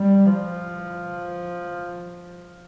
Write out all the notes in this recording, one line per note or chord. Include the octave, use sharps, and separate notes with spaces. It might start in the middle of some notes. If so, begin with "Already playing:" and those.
Already playing: G3
F3